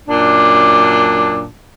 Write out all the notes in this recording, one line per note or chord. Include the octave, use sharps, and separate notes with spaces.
F#2 A#2 D4